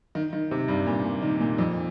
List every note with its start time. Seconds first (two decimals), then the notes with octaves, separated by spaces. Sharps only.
0.15 D#3
0.33 D#3
0.51 C3
0.68 G2
0.87 A#2
1.04 A#2
1.22 D#3
1.40 A#2
1.58 F2